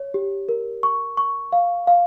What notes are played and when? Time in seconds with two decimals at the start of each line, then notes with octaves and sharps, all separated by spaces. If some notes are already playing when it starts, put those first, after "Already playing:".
Already playing: C#5
0.14 G4
0.49 A#4
0.83 C#6
1.17 C#6
1.53 F5
1.87 F5